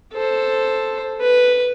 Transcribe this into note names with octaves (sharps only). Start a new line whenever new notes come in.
A4 C5
B4